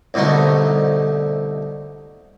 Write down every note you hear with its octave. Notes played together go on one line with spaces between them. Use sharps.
C2 B2 D3 A3 D#4